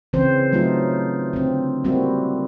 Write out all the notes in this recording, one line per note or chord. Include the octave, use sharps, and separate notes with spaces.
C#3 E3 C4 C5
F#3 A3 D#4 F4
D3 C4
G3 A#3 C4 E4 F#4